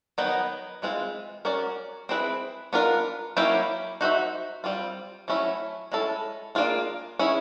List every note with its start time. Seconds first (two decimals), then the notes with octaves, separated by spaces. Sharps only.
0.18 D#3 F#3 B3 D#4
0.82 E3 G#3 C4 F4
1.45 C#4 F#4 A#4 D5
2.09 C4 E4 G#4 B4
2.73 B3 D4 F4 A#4
3.37 F#3 A#3 C#4 E4 G4
4.01 D#4 F#4 A4 C5 E5
4.64 G3 C4 F4
5.28 F#3 A3 C#4 E4
5.92 G#3 C#4 E4 A4
6.55 A#3 D4 F4 G#4
7.19 C#4 E4 G#4